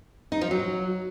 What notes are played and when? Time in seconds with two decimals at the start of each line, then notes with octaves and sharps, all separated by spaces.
0.32 D#4
0.41 F3
0.51 F#3